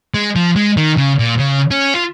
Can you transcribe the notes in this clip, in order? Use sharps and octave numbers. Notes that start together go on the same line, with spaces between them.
G#3
F3
G#3
D#3
C#3
A#2
C#3
C#4
F4